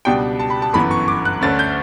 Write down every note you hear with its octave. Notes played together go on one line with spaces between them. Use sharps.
C#2 B2 G3 D4 G5
A5
B5
A5
G1 F#2 E3 B3 B5
C#6
D6
F#6
D2 D3 A3 C#4 A6
G6